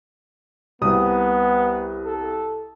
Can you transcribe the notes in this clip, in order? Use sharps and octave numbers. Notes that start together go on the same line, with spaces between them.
C2 B3 D#6
A4